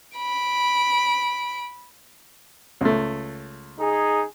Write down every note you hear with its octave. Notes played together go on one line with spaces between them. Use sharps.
B5 D7
C#2 A3
D#4 G#4